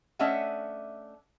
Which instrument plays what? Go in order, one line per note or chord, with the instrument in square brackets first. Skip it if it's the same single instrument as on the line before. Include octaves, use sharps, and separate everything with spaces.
[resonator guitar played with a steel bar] A3 C#4 D4 D#5 E5 F#5